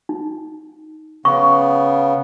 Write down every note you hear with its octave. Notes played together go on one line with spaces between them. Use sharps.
D#4
C#3 B3 C#6